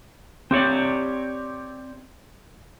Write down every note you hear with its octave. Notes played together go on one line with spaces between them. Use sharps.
C4 G4 C#5 D5